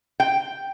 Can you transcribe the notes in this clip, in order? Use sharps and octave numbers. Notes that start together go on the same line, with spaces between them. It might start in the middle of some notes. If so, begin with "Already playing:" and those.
G5